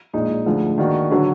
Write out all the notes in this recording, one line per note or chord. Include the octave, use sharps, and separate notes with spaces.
A#1 A#2 G#3 D#4
D2 D3 F3 G#3
D#3 A#3 D4 F#4
D3 F#3 D4